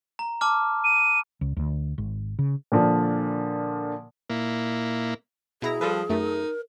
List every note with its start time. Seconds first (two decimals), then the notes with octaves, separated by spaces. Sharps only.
0.19 A#5
0.41 A5 D6 F6
0.84 D#7
1.41 C#2
1.57 D2
1.98 G#1
2.39 C#3
2.72 A#2 D3 F3
4.30 A#2 A#3 E4
5.62 B2 E4 G#4 A#5
5.81 F3 G3 A4 B4
6.09 F#2 A3 D#4 A#4